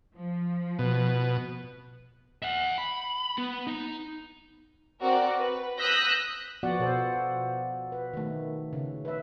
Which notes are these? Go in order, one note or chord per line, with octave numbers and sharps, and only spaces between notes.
F3
B2
E5 F#5
B5
B3
D#4
C4 F#4 A#4 D5
B4
D#6 E6 F#6 G6 A#6 B6
F3 B3 F#4 D5 F#5
B2 A4 C5
B4
D#3 A3
C#3
B4 E5